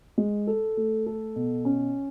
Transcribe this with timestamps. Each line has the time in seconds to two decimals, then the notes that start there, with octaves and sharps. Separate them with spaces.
0.18 G#3
0.47 A4
0.77 A3
1.06 A4
1.36 B2
1.65 C#4